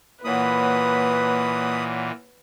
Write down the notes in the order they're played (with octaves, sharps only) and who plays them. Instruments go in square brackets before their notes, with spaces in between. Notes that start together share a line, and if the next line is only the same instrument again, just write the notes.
[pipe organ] A#2 E3 [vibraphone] A#3 C#5 F#5 [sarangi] B4 [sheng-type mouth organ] B5 D#6